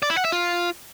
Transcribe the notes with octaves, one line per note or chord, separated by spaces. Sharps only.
D5
E4
F#5
E5
F4